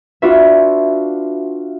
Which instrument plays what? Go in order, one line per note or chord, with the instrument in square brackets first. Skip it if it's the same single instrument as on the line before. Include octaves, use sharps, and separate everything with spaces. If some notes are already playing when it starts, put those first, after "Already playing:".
[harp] D4 F4 F#4 B4 E5